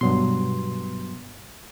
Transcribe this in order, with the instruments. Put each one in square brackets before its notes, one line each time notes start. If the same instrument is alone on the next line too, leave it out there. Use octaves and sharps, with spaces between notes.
[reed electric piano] G2 F#3 C6 [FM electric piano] B2